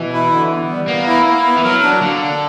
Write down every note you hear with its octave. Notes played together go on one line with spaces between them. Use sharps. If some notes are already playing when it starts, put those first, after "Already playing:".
Already playing: B2 E3
E4
D3
B3
G3
A#3 B3
E4
E4
B3
E3
F#3 A#4
D4
D3 A#3
D4